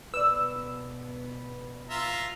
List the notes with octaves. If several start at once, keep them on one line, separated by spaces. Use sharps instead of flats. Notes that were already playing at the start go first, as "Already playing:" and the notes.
B2 B3 B4 D5 E6
F4 E5 A#5